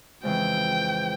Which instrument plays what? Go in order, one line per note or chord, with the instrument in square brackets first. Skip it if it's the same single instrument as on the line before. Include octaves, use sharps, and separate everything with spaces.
[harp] F2 C#3 E3 G#3 [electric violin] G5